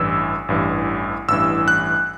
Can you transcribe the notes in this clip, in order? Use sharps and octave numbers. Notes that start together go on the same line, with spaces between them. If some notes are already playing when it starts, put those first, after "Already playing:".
Already playing: A1 G2 E3 E6
A1 G2 E3
A1 G2 E3 E6
F#6